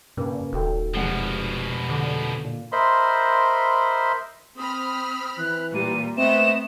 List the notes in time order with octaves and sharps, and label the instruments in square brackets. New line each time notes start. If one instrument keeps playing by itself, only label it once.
[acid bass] G2 [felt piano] C#3 A#3 B4
[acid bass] D#1 [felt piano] F#4 A4 G5
[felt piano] F1 G#3 F#5 [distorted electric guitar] B2 F3
[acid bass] D3
[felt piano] A#2
[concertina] A#4 C5 D#5 E5 B5 C6
[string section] C4 B5 F6 [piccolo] D#6
[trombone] E3 [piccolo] F#6
[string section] A#2 G3 [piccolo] D#7
[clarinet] A3 [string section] B3 D#5 [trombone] C4 [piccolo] E7